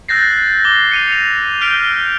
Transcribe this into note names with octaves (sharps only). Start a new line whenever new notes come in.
E6 F#6 G6 A6 A#6 C7
D6 G7
C#7 D#7 F7
F7
F6 G6 B6 D7 F7